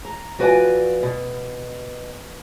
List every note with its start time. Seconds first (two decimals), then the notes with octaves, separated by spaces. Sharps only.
0.05 A#5
0.39 F3 F#4 B4 C#5 D5 G#5
1.03 B2